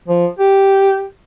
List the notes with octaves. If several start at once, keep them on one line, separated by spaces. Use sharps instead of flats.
F3
G4